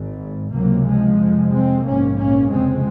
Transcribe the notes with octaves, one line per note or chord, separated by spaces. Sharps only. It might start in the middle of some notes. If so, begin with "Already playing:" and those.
Already playing: G#1 G#2
C#2 C3 F#3 A#3
F3 G#3
F1 F2 C3
G#3 C4
A#1 G#2 A#3 C#4
A#3 C#4
F1 F2 C#3 G#3 C4